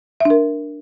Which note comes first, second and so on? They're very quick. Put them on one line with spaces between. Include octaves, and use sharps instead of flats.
E5 D4 A#4